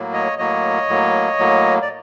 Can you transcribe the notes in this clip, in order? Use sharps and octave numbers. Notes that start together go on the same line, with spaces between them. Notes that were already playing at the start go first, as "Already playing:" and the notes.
Already playing: A2 F#3 A#3
C#5 D#5
A2 F#3 A#3 C#5 D#5
A2 F#3 A#3
A2 F#3 A#3
D5